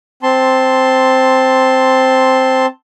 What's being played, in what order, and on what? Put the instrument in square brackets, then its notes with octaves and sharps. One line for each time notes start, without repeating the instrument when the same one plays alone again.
[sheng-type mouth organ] C4 A5 C6